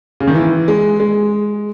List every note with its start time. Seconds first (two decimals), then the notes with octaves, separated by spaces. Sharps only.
0.20 C#3
0.27 D#3
0.35 E3
0.68 G#3
1.00 G#3